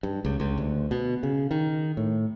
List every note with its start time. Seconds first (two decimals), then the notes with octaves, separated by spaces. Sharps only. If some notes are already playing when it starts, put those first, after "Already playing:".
0.03 G2
0.25 C#2
0.40 C#2
0.58 D2
0.91 B2
1.23 C#3
1.51 D#3
1.97 A2